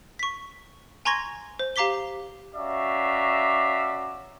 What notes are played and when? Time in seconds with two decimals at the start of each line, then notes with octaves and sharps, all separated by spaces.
0.19 C#6 B6
1.05 G#5 A#5 C6 C#6 G#6 A#6
1.59 C5
1.76 G4 F5 A#5 D6 B6 G7
2.55 C#4 F#4 D5 E5 F5 A#5